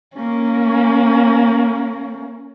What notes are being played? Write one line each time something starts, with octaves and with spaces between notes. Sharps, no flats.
A#3 C#4